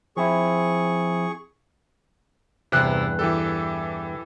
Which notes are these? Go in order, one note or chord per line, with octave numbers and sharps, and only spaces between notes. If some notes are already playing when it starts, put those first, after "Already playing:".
F3 C4 E4 G#4 C#6
E2 G2 C3 F#6 C7
E3 G4 A4